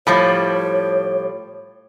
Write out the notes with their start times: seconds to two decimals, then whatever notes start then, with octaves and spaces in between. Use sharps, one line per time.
0.07 A2 F3 G3 C#5